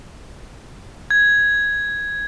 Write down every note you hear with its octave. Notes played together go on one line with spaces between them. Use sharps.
G#6